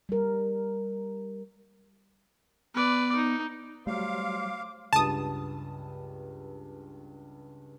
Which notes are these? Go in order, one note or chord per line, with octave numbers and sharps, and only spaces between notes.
G3 A#4
B3 B4 D5
D#4
F#3 G3 A3 C5 F5 D6
C#2 G2 A5 D#6